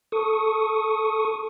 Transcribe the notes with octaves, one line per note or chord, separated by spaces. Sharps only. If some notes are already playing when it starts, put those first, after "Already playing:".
A4 C#6 D#6